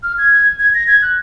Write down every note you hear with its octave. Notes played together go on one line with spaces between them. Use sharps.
F6
G#6
G#6
A#6
G#6
F#6